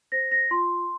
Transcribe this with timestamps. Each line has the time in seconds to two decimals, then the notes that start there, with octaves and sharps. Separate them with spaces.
0.12 C5 A#6
0.31 A#6
0.51 F4 C6